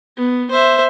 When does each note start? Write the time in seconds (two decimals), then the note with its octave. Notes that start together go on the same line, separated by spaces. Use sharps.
0.17 B3
0.51 C5 E5